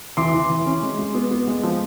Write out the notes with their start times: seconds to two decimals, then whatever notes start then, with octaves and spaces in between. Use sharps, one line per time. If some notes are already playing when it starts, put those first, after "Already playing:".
0.17 E3 C6 D6
0.34 E3
0.50 E3
0.66 C#4
0.83 G#3
0.99 G#3
1.15 B3
1.31 B3
1.47 G#3
1.63 F3